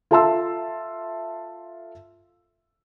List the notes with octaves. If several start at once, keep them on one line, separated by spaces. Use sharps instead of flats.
F4 A4 E5 A5 C6 E6